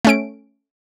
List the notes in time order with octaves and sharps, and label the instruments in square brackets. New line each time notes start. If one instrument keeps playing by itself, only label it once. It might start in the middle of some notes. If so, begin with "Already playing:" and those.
[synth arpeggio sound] A3 C#4 D7